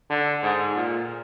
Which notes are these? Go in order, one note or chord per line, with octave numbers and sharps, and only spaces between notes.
D3
G#2
A#2